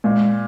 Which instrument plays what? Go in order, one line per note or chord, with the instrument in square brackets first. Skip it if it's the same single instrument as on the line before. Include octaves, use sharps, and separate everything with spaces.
[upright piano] A#2 [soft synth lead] G#3